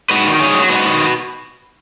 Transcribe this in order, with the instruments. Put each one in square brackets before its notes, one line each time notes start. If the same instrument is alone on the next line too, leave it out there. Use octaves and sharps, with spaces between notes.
[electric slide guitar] G#2 F#4 B4
D#3
G#2 G#4 C#5
F#3
G#2 F#4 B4
D#3